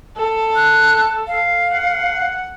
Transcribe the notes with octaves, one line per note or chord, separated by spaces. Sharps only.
A4
F#6
F5
F#5